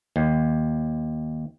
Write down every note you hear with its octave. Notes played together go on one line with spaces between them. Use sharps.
D#2